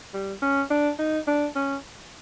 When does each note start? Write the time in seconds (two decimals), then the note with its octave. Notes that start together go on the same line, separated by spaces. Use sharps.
0.14 G3
0.42 C#4
0.70 D4
0.99 D#4
1.27 D4
1.56 C#4